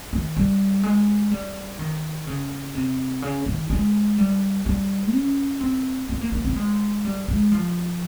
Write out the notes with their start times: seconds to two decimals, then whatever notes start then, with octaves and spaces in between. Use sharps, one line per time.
0.13 D#3
0.37 G3
0.83 G#3
1.31 G3
1.79 D#3
2.27 C#3
2.75 C3
3.22 C#3
3.46 D#3
3.70 G#3
4.18 G3
4.66 G3
5.13 C#4
5.61 C4
6.09 C4
6.21 A#3
6.32 A#3
6.45 C4
6.56 G#3
7.05 G3
7.28 G#3
7.52 F3